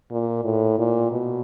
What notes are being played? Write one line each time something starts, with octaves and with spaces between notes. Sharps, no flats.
A#2
A2
A#2
B2